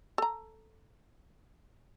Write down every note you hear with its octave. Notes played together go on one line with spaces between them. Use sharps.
A4 A#5